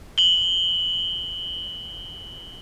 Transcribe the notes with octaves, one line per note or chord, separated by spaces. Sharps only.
F#7 G7